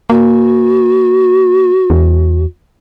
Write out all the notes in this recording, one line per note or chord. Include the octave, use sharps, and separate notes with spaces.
A#3 F#4
E2